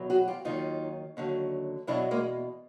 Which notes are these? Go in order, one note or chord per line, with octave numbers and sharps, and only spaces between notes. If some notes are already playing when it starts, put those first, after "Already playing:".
Already playing: E2 B2 F#3
F#4 G#4
F4 G4
D#2 D#3 F#3 D#4 F4
D#2 D3 F#3
E2 B2 F#3 D4 E4
G#3 A#3